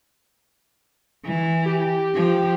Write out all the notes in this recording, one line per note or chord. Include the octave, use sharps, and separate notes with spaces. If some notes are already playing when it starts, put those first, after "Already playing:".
E3
G4
F3